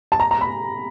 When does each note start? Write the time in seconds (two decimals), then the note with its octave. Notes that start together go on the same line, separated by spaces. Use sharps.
0.12 A5
0.20 A#5
0.31 A#5
0.41 B5